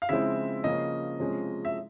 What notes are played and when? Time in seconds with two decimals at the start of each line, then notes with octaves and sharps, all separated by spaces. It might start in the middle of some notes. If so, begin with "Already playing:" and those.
0.02 F5
0.09 C#3 F3 G#3 C4 E4 E5
0.64 C#3 F3 A#3 C#4 D#5
1.20 C3 F3 G#3 C#4
1.65 E5